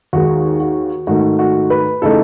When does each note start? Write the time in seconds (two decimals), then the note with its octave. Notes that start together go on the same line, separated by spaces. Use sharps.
0.13 D#2 D#3 G#3 F#4
0.60 F#4
1.07 G#2 D#3 A3 F#4
1.39 F#4
1.70 B4
2.02 C#3 E3 A3 D#4 A4